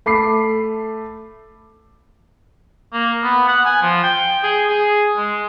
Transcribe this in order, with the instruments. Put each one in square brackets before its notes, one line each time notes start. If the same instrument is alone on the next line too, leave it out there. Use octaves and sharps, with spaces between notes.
[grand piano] A3 B5 D6 C7
[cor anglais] A#3
B3
F#5
G#5
F3
G5
G#4
G#4
G#3